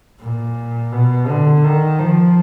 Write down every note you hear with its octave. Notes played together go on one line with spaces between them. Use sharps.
A#2
B2
D3
D#3
F3